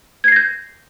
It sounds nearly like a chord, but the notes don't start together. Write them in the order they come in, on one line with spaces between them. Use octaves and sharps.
G#6 C7 A#6 G6